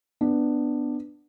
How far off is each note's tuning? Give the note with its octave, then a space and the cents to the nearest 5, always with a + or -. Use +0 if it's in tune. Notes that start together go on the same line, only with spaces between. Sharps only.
B3 +5 D4 +10